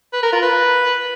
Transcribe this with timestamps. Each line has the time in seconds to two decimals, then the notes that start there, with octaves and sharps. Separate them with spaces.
0.13 B4
0.23 A#4
0.33 F4
0.42 B4